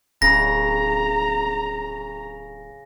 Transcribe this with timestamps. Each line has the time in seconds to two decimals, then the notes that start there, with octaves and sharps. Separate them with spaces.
0.22 D1 C#3 A#5 A#6